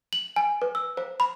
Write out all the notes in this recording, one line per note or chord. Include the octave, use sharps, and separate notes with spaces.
F#7
G#5
B4
E6
C5
B5